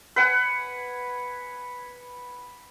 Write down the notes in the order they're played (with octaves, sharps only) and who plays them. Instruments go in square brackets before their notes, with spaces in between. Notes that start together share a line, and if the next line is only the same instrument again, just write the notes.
[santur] B4 F#5 G#5